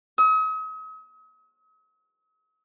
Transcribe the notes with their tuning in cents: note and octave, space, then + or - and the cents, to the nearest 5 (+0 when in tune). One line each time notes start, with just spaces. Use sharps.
D#6 +45